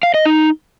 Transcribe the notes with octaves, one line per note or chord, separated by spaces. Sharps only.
F5
D#5
D#4